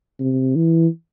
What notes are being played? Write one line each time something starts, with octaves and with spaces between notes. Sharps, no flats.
C3
E3